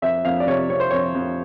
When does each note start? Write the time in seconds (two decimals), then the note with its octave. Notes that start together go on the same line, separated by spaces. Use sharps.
0.02 F2 E5
0.25 F2 F5
0.40 D5
0.47 C3 C#5
0.69 C3 C#5
0.80 C5
0.91 F2 C#5
1.15 F2